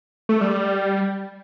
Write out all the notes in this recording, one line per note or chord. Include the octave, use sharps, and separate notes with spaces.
A3
G3